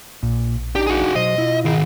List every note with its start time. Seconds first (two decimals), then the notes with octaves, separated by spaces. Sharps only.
0.23 A#1 A#2
0.75 D4 D#4 G4
0.87 F#4 G#4
1.16 B2 F#3 C5 D#5
1.38 E4 F4
1.65 D#3 G#4